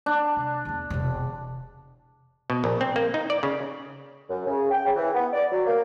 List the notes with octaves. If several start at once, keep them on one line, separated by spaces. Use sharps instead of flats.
D4
C3
E2 A#3
E1 C3
B2
A#1
C4
A#3
D#4
D5
C#3
F#2
C#3
G5
C#3
E3
B3
D5
F#3
A#3